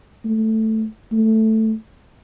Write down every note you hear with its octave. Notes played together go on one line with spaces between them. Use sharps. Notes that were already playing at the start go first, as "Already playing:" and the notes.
A3
A3